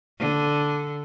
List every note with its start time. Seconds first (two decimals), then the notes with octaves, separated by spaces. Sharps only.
0.20 D3